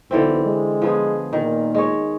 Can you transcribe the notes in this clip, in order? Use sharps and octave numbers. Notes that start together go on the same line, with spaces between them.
B1 D3 E3 C4
G#3
F3 B3 G#4
A#2 D#3
G#3 C#5